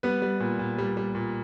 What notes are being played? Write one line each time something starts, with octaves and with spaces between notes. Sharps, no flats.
G3 B3 B4
G3
A#2
A#2
G3
G3
A#2